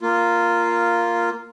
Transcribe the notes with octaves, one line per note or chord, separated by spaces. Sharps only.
A#3 F4